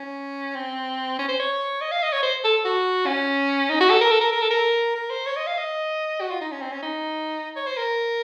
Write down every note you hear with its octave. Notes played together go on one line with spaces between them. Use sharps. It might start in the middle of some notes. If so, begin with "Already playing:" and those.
Already playing: C#4
C4
C#4
C5
C#5
D#5
F5
D#5
C#5
C5
A4
F#4
C#4
D#4
F#4
A4
A#4
A4
A#4
A#4
A4
A#4
A#4
C5
C#5
D#5
F5
D#5
F#4
F4
D#4
C#4
C4
C#4
D#4
C#5
C5
A#4